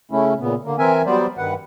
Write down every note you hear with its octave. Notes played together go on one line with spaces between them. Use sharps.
C#3 A3 C#4 E4
A#2 C#3 B3
D3 A#3
E3 C4 A#4 E5 G#5
F#3 G3 B3 C5 D5
G2 D#3 B4 F#5